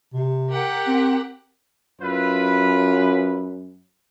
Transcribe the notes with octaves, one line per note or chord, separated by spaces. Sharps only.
C3
G4 A#4 F#5
C4
F#2 E4 F4 B4